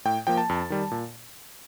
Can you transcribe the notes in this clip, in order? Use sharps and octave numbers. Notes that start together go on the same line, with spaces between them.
A2 G5
F3 A#3 G5
A5
F2
D#3 G3
A#2